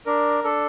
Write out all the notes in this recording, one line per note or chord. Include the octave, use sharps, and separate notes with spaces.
D4 A#4
D4 A4